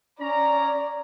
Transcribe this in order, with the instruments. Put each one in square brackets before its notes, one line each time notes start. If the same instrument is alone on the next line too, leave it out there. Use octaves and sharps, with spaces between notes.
[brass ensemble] C#4 A#5 [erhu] D5